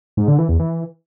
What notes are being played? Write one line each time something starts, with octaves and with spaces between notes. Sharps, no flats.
G#2
D3
E3
E2
E3